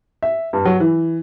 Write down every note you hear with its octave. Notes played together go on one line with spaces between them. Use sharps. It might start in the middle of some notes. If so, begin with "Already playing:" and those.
E5
G2
F#3
E3